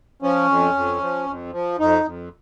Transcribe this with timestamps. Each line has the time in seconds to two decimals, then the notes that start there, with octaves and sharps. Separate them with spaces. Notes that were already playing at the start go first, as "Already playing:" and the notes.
0.22 F3 C#4
0.48 F2
0.74 F2
1.01 F3
1.26 F2
1.52 F3
1.79 F2 D#4
2.04 F2